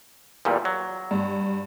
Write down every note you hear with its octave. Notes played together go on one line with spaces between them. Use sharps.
E2 A#2 G3
F#3
G2